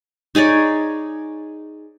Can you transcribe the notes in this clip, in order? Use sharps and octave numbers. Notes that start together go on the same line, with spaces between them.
D#4 G#4 C#5 D5